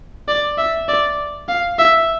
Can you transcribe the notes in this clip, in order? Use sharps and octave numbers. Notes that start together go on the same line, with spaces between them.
D5
E5
D5
F5
E5